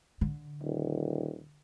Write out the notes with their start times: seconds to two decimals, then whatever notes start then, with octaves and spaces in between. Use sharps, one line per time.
0.21 D3
0.63 D#1